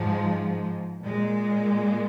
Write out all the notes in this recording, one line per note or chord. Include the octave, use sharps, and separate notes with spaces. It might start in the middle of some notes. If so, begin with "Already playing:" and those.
Already playing: G#2 F3 G#3
A#2 G#3